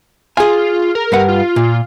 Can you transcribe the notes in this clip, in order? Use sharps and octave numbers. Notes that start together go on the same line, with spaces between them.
F4 G#4 G#5
A#4
G2 B4 F#5
F4
A#2